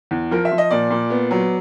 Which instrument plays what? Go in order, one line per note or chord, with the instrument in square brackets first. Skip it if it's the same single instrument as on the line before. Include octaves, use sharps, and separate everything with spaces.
[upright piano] E2
F3 A#4
E5
F3
D#5
A#2 D5
A#2
B3
F#3